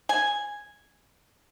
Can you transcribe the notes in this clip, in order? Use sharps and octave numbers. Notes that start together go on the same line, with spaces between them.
G#5